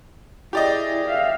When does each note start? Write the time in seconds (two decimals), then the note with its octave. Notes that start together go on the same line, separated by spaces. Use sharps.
0.53 E4 G4 G#4 D5 D#5
1.06 E5 F5